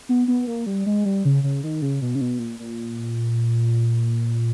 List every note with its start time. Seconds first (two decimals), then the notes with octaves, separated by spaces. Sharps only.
0.09 B3
0.28 B3
0.47 A#3
0.66 G3
0.86 G#3
1.05 G3
1.25 C#3
1.43 C#3
1.63 D#3
1.82 C#3
2.02 B2
2.15 C#3
2.21 B2
2.39 A#2
2.59 A#2